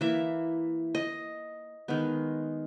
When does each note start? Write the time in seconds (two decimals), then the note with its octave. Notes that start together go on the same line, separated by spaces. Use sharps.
0.01 E3 A#3 E5
0.95 D#5
1.88 D#3 G#3 B3